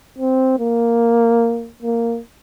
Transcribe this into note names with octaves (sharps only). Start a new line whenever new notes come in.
C4
A#3
A#3